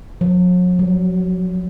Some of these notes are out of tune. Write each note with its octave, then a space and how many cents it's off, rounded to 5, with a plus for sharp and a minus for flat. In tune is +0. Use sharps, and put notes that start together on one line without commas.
F#3 -45
F#3 +30